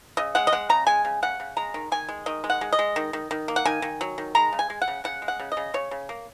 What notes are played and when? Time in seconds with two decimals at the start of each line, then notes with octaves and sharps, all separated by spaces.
0.17 C#3 D#5
0.35 G#3 F#5
0.47 D#5
0.52 G#3 F#5
0.69 C#3 A#5
0.87 G#3 G#5
1.05 C#3
1.22 C#3 F#5
1.40 C#3
1.57 G#3 A#5
1.74 D#3
1.92 D#3 G#5
2.09 G#3
2.26 D#3 D#5
2.44 G#3
2.50 F#5
2.61 G#3
2.72 D#5
2.79 G#3
2.96 D#3
3.13 D#3
3.31 D#3
3.48 A#3
3.56 F#5
3.65 D#3 G#5
3.82 D#3
4.01 F#3
4.18 D#3
4.35 G#3 A#5
4.53 C#3
4.59 G#5
4.70 G#3
4.82 F#5
4.88 C#3
5.04 C#3 F#5
5.22 G#3
5.28 F#5
5.39 C#3
5.52 D#5
5.57 C#3
5.74 C#3 C#5
5.91 C#3
6.09 A#3